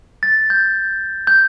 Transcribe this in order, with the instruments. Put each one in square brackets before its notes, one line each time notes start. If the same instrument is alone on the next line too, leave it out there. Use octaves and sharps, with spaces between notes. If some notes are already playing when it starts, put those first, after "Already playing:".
[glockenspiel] A6
G6
G6